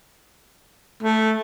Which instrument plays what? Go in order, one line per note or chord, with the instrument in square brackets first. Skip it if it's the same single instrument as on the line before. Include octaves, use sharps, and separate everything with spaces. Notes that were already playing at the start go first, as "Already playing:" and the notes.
[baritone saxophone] A3